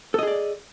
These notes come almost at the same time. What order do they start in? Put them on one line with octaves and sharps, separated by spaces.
A4 D#5 G#4 D5